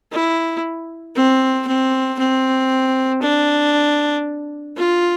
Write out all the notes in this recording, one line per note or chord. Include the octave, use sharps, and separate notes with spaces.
E4
C4
C4
C4
D4
F4